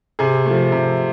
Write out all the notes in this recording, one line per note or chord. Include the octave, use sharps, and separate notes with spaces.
C3 G#4
F3 A3
C3